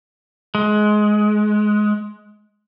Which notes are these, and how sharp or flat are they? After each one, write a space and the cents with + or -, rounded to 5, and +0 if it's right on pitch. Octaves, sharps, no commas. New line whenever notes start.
G#3 +20